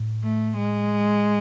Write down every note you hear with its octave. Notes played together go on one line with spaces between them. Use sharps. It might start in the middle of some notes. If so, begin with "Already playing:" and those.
Already playing: A2
A3
G#3